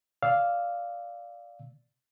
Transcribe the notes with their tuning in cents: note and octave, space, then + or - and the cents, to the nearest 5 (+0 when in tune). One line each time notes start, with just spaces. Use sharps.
D5 -5 F5 +0 E6 -10